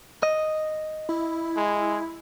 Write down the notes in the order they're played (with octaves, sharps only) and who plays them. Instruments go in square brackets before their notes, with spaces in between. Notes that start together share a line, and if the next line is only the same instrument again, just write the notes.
[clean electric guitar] D#5
[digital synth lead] E4
[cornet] G#3